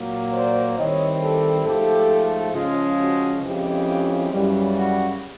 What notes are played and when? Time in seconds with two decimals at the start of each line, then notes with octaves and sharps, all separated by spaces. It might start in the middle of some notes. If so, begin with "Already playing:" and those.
Already playing: A#2 F#3 A#3
0.33 C5 D5
0.77 D#3 G3 C4 E4 C#5 D#5
1.21 G4 A4
1.66 G#2 F3 A3 G4 A4
2.54 C#3 F3 G#3 F4
2.99 F#4
3.43 F2 C#3 E3 G#3 C#4 F4 G4
4.32 F#2 C#3 E3 G3
4.76 F#4